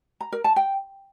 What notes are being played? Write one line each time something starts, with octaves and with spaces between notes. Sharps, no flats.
A#5
A#4
A5
G5